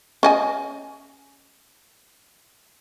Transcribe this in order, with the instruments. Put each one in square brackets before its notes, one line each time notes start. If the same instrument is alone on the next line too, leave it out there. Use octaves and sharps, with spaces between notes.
[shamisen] C#4 D#5 G#5